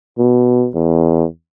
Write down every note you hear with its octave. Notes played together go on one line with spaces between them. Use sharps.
B2
E2